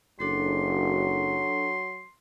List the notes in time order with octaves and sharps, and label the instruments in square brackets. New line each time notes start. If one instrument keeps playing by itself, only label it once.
[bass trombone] F#1 [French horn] F#3 [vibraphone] D4 F#4 A4 [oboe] C6